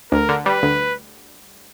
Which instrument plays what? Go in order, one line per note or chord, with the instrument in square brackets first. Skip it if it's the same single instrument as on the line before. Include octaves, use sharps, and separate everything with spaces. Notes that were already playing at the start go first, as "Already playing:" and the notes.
[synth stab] D2 [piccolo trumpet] A#4
[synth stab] D3
[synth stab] G3 [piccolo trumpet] B4
[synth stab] D2